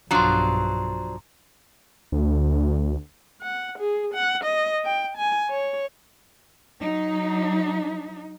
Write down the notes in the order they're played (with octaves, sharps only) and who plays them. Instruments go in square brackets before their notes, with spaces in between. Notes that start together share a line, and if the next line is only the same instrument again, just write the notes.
[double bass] B1 G2 [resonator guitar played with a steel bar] F3 F#3 D4 [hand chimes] A#5 C6
[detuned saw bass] D2
[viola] F#5
G#4
F#5
D#5
G5
G#5
C#5
[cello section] F#3 D#4